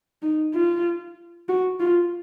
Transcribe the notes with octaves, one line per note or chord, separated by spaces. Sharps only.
D#4
F4
F#4
F4